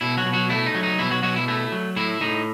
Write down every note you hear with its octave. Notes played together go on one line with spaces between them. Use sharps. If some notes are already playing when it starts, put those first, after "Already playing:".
B2 E4
F#3 F#4
B2
F#3 F#4
A3 E4
D#4
F#3
D#4
B2 E4
F#3 F#4
B2 F#3 F#4
E4
A3 E4
F#3
A2 E4
A2 D#4